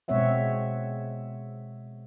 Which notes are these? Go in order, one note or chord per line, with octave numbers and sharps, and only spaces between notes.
B2 G#3 C4 C#5 E5 F#5